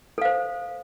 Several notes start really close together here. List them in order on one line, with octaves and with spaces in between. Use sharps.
A4 F5 C5